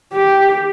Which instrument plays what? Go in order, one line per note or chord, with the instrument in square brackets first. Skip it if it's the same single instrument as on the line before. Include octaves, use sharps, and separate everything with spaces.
[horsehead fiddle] G4